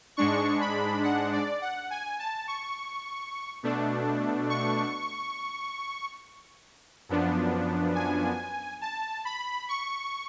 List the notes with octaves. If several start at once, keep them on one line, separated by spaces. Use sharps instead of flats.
G#2 G#3 D4 C#6
B5
F#5
D5
F#5
G#5
A5
C#6
B2 A3 D4
C#6
F#2 F3 B3 D4
G#5
A5
B5
C#6